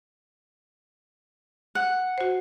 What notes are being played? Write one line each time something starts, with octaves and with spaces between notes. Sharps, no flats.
F#5
F#4 C5